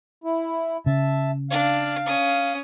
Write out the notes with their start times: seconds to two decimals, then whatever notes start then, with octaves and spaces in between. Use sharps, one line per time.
0.24 E4
0.86 C#3 E5 A5
1.51 D4 F5
2.06 C#4 D#6